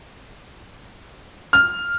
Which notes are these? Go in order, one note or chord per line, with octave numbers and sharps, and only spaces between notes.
F6